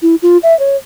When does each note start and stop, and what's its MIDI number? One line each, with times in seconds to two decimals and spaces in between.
0.02 0.15 64
0.22 0.37 65
0.43 0.57 76
0.59 0.76 73